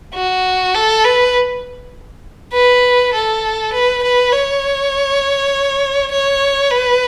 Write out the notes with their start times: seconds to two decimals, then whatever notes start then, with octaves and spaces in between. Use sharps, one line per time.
0.15 F#4
0.75 A4
1.04 B4
2.53 B4
3.14 A4
3.73 B4
4.03 B4
4.32 C#5
6.12 C#5
6.70 B4